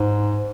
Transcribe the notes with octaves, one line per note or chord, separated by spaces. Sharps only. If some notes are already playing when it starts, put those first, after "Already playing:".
Already playing: G#2